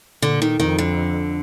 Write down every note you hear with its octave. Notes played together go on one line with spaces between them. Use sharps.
A#2 D3
D#3
F2 D#3
D3